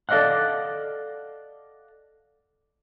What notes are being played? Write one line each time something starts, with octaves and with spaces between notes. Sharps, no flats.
A4 D5 D#5 F5 F#5